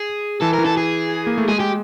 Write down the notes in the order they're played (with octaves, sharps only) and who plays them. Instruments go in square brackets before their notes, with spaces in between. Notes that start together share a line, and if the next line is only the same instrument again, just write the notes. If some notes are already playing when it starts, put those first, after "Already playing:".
Already playing: [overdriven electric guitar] G#4
[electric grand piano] E3 [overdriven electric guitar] A4
[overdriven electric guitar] A#4
[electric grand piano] E3
[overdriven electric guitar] A4
G#4
[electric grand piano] A#3
A3
[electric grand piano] G#3 [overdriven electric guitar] G#4
[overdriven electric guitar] G4